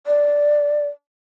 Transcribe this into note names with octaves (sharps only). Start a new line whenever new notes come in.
D5